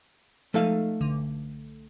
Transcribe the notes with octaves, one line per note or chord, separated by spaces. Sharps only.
F3 G#3 A3 D#4 A4 F5
B1 D3